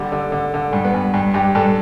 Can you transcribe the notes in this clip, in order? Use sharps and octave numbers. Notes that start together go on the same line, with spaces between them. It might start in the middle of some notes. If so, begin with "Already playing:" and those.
Already playing: D3 G3
D3
D3
D3
G2
B3
G2
G2
G2 G4
G2 A4